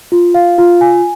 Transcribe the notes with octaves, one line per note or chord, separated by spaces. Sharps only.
F4
F5
F4
G#5